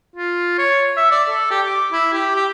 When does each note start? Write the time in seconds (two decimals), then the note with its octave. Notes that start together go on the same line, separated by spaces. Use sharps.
0.16 F4
0.59 C#5
0.97 E5
1.11 D5
1.30 A4
1.51 G4
1.67 D6
1.93 E4
2.13 G4
2.36 G4